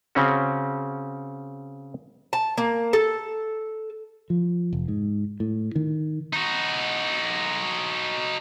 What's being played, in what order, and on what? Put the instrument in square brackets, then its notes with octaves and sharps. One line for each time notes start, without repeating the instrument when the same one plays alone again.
[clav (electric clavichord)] C#3 C4 C#4 F#4
[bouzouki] A5
A#3
A4
[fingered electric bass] F3
F1
G#2
A2
D#3
[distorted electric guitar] D#4 F#4